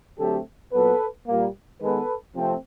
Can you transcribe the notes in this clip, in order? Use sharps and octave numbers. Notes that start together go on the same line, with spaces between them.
D3 F#3 A3 C4 G4 A4
A#2 F#3 B3 A4 B4
A#2 G3 A#3
D#3 G#3 B3 A4 B4
C3 F3 A3 C4